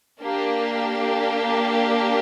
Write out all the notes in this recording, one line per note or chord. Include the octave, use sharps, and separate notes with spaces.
A#3 D4 G4